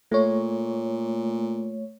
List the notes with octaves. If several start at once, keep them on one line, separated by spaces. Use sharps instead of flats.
A#2 A3 C#5